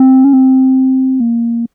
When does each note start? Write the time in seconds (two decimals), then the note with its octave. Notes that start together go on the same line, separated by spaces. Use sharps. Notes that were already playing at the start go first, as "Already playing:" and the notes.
Already playing: C4
0.24 C#4
0.33 C4
1.20 A#3